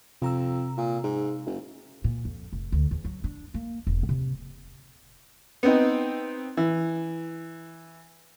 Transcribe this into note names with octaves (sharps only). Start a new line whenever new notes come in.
F2 C3 A#5 E6
A#2
G#2
F#1
A#2
F2
F1
D2
E2
F#3
D4
A#3
E1
C3
B3 C4 D#4
E3